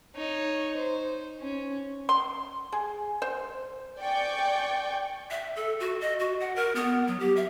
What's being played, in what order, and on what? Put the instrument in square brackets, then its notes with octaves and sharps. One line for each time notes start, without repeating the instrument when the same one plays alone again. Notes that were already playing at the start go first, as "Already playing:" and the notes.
[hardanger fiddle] D#4 C#5
C5
C#4
[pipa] C6
G#4
C5
[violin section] D5 G5 G#5 C#6 G6
[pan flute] E5
A4
F#4
D#5
F#4
F#5
A#4
B3
F#3
G4
E5